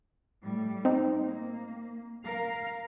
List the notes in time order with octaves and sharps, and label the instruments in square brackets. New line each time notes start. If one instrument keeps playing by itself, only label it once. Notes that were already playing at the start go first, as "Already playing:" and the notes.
[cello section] A2 G3
[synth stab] C4 D#4
[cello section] A#3
A#4 F5